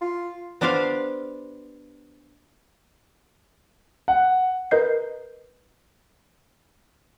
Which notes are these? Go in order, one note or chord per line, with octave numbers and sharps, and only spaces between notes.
F4
B3 D4 G4 C5 D5 F5
F#5
A#4 B4 D#5 G6 C7